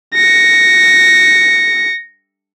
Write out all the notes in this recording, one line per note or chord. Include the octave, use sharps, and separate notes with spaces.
A#6 C#7